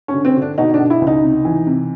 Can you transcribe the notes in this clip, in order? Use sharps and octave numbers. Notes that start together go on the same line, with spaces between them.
C#4
D3
C4
D3
D4
B2 D#4
D4
B2
E4
C#2
D#4
C3
E3
C3